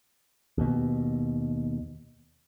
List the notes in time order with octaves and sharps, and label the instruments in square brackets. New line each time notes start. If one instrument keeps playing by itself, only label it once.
[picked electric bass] D#2 B2